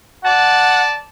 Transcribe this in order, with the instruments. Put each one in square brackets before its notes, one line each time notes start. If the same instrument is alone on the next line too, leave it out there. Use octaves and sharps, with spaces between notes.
[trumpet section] D5 A5 [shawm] F#5